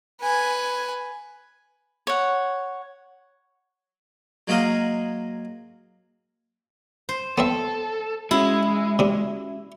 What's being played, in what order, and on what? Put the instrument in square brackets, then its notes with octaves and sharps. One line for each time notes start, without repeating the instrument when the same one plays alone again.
[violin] B4 G#5
[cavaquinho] C#5 F#5
[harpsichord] F#3 G#3 A#3 F#4 D#5 F5
[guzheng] C5
[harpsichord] B3 C4 E5 [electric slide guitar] A4
[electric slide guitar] G#3 [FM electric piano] C#4 F#4 [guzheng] E4
[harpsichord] C3 D4